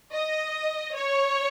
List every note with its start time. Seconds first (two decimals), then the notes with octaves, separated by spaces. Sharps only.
0.13 D#5
0.95 C#5